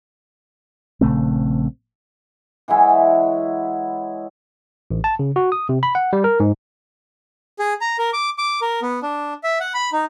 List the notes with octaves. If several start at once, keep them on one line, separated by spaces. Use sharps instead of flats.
A#1 C#3 A3 C4
E3 F#3 G#3 E4
A1
A5
C#3
F#4
D#6
C3
B5
F#5
G3
A#4
G#2
G#4
A#5
A#4
D6
D6
A#4
B3
D4
E5
F#5
B5
D#4